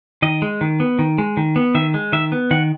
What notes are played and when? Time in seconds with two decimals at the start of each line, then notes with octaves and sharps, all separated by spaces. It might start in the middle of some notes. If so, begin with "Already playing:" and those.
0.22 D#3 D#5
0.42 G#3
0.61 D#3
0.80 B3
0.99 D#3
1.18 G#3
1.37 D#3
1.56 B3
1.75 D#3 E5
1.94 G#3
2.13 D#3 E5
2.32 B3
2.51 D#3 F#5